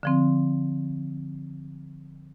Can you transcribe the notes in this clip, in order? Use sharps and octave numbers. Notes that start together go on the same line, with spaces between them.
D3 F3 C4